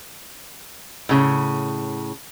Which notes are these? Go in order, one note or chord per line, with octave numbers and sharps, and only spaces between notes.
A2 C#3